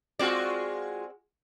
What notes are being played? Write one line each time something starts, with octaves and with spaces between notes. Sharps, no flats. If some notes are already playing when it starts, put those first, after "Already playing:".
G#3 C4 F4 F#4 D5